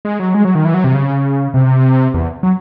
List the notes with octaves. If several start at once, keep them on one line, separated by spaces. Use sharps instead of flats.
G#3
F#3
G#3
F#3
D#3
E3
F#3
C3
C#3
C3
E2
F#3